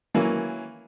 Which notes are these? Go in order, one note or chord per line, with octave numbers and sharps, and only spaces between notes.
E3 F#3 A#3 C#4